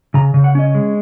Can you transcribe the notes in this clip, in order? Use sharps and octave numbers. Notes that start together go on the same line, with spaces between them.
C#3 A#5
C#3
F#5
C#4 D#5
G#3